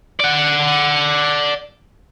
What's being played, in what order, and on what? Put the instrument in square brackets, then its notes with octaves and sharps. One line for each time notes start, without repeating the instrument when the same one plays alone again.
[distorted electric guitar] D5 F#5